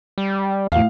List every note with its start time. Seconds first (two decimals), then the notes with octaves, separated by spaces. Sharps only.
0.18 G3
0.72 E2 A2 F5